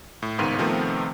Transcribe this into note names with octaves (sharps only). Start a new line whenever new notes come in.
A2
G#1 C#2 G#2 D#3 B3 D#7
C3 D#3 F3 A3 B3 C4